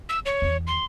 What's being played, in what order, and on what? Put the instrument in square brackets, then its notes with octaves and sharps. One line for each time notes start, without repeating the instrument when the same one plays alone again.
[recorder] E6
C#5
[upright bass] E2 D#3
[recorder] C6